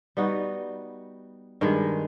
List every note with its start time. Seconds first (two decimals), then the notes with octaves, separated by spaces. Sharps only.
0.17 G3 B3 D#4 F#4
1.61 G2 D#3 G#3